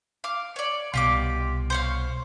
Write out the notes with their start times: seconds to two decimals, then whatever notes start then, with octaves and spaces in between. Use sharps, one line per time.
0.24 F5 D6
0.56 C#5 D5
0.94 C2 B2 F4 G4 D6
1.70 C5 C#5 F5